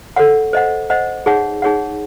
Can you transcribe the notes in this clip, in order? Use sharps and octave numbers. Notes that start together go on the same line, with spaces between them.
A4 C#5 F#5
C5 D#5 F#5
C5 D#5 F#5
D#4 G#4 C#5 F#5
D#4 G#4 C#5 F#5